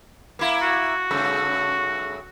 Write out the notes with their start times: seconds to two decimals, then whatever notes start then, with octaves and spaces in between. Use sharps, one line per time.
0.39 A#3 E4
0.62 F#4
1.11 G2 C#3 A3